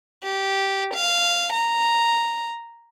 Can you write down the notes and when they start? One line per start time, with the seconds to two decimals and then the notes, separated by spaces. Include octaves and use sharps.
0.24 G4
0.94 F5
1.53 A#5